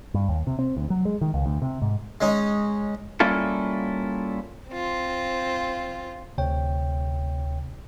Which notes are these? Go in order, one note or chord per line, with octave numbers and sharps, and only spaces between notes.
G2
D#2
C3
C4
D2
F#3
G#3
D#3
C#2
D2
C3
G#2
G#3 C#4 D#4
G3 A#3 C#4 E4 F4 A4
C4 F4
D2 C3 C#5 G5